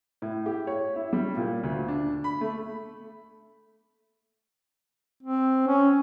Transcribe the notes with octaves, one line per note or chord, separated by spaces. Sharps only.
A2
G4
C#5
E4
G3
A#2
D2
D4
B5
A3
C4
C#4